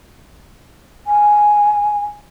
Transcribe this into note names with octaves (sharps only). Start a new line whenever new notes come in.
G#5